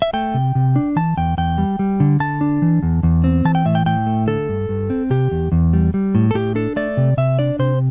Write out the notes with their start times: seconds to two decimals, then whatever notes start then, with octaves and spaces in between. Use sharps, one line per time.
0.02 E5
0.13 A3 G5
0.34 C3
0.55 C3
0.76 D4
0.96 E3 A5
1.17 E2 G5
1.38 E2 G5
1.58 G3
1.79 G3
2.00 D3
2.20 D3 A5
2.41 D4
2.62 E3
2.83 E2
3.03 E2
3.24 C4
3.45 E3 A5
3.55 G5
3.65 A2 E5
3.75 G5
3.86 A2 G5
4.06 A3
4.27 D3 A4
4.49 G2
4.69 G2
4.90 C4
5.10 C3 G4
5.31 E2
5.52 E2
5.73 G3
5.94 G3
6.15 A2
6.31 A4
6.34 A2 G4
6.55 D4 A4
6.76 A3 D5
6.97 C3
7.17 C3 E5
7.39 D4 D5
7.59 C3 C5